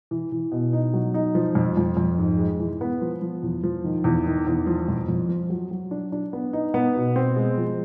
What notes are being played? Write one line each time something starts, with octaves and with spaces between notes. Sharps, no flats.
E3
E3
B2
D#4
F#3
D#4
F3
F2
F2
F2
G#2
G#3
E3
B3
F3
F3
E2
F3
D#3
E2
D#3
E2
F3
F2
F2
F3
F#3
F#3
D4
D4
B3
D#4
B3
B2
C4
G#3
F3